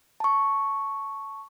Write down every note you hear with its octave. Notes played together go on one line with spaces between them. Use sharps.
A5 C#6